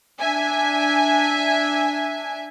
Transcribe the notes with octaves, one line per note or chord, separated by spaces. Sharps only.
D4 E5 G#5